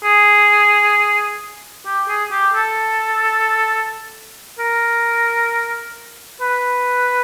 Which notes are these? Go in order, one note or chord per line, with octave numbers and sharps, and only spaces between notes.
G#4
G4
G#4
G4
A4
A#4
B4